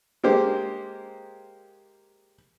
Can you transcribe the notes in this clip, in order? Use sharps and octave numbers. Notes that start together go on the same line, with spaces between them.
G#3 A#3 G4 C5